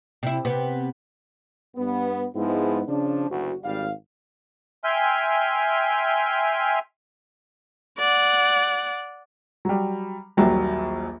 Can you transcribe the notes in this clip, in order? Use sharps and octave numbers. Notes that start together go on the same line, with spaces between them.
C3 E4
C3 B3
G2 B3
G#2 F3 G#3 B3 E4
C#3 F3 D4
F#1 D2 F#4
G#1 G3 F5
E5 G5 G#5 C6 F6
D5 F#5
F#3 G3
A#1 D#2 F#3 G3